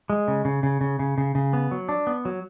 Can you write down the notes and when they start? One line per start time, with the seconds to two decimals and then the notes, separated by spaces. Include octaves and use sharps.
0.10 G#3
0.28 C#3
0.45 C#3
0.63 C#3
0.81 C#3
0.99 C#3
1.18 C#3
1.35 C#3
1.53 B3
1.71 F#3
1.89 D4
2.07 B3
2.25 F#3